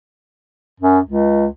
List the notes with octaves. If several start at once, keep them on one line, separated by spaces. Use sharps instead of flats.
F#2
C#2